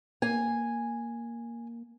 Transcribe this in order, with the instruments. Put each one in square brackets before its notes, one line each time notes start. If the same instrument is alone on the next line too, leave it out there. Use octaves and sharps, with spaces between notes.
[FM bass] A#3 [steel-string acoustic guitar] G#5